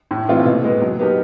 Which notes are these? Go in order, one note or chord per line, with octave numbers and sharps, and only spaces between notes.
A2
E3 A3 C4 F4
B2
G#3 B3
F#3
B3 D#4 G4 A#4